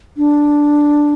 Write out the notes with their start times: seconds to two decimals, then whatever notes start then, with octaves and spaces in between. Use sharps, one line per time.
0.17 D4